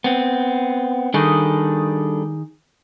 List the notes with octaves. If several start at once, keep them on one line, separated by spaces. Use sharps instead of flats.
B3 C4
D#3 G3 D4 G#4 A4